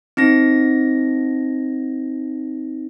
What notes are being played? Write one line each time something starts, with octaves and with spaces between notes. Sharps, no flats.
C4 D#4 A#6